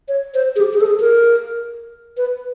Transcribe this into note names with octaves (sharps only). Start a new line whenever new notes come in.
C#5
C5
G#4
G4
G#4
A4
G#4
A#4
B4